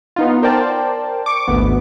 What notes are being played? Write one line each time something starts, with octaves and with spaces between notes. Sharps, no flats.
B3 D#4 F4
A#4 C5 D5 G5 A5
C#6 D6
G#1 D2 B3